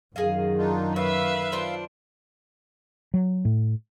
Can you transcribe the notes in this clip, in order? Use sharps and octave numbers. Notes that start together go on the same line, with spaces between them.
F#2 D#3 G#4 D#5 F5
D4 D#4 F4
B4 C#5 E5 F5 E6
D4 F4 C5
F#3
A2